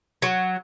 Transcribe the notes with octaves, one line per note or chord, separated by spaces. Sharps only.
F#3